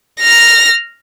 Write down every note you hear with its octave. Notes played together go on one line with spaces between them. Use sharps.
F6 A#6